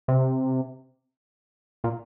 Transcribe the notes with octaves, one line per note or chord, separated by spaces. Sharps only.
C3
A#2